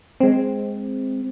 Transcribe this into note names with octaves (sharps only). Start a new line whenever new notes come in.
G#3 C4